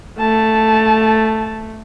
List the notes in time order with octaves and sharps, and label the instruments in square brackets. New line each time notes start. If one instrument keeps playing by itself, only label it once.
[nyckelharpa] A3 [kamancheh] A5